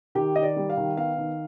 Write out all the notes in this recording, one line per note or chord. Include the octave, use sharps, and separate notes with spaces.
D#3 G4
D#3 D#5
D5
G3
F5
D#3
B3 F5
D#3